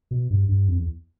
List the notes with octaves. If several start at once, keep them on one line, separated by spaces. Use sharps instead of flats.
B2
G2
G2
F2
E2